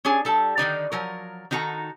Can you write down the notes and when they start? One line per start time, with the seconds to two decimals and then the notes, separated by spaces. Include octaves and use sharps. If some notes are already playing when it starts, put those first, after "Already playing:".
0.05 C#4 D4 G#4
0.25 G3 A4 A5
0.58 D3 D#3 D#4 D5
0.92 F3 F#3 A#4
1.51 D#3 D#4 F#4 A4 A#5